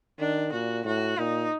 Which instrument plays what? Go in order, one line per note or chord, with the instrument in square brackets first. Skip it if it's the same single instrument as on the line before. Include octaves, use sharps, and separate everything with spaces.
[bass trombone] D#3 [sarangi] D4
[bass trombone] A#2 [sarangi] F#4
[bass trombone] A2 [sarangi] F#4
[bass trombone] A#2 [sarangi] D#4